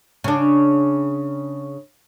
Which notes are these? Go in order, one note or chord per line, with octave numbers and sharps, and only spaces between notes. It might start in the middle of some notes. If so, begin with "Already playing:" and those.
C#3 D4